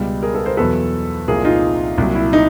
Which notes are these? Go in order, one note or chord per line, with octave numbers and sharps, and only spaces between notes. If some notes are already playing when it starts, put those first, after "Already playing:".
Already playing: C#2 B2 G3
G#4 A#4
A4 B4
A#4 C5
E2 B2 F#3 A4 B4
C2 A#2 F3 G#4 A#4
D#4 F4
C2 A#2 F#3
E4
D#4